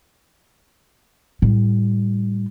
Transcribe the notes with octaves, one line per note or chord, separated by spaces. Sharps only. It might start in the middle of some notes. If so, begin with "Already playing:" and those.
A2 G3